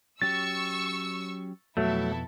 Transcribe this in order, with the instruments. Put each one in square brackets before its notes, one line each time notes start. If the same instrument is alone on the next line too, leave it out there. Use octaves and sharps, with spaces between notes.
[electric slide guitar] F#3 C#4 G4 [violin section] C#6 E6 [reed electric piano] A6
[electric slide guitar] F2 B2 B3 [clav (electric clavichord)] F#3 A3 [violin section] E4 A4